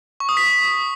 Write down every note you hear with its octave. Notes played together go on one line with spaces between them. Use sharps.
C#6
D#6
B6